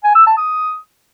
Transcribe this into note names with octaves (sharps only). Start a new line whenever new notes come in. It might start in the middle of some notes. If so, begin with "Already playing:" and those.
G#5
E6
A5
D#6